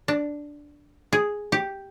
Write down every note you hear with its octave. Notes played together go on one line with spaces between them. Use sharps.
D4
G#4
G4